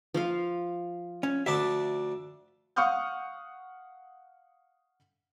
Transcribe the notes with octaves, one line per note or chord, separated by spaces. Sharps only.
F3 F5
C#4
D2 D4 E5 A5
F5 F#5 C#6 D#6 F6 G6